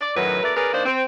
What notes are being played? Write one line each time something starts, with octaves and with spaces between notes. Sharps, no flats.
D5
F#2 A2 D#3 F#3 B4
G2 A3 A#4 B4 D5
C#4 G#4 A#4 B4 D5
D#3 A#3 D4 C5
C4